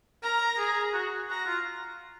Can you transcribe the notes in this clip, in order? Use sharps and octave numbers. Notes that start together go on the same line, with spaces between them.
A#4 A#5
G#4
F#4
F#4 A#5
F4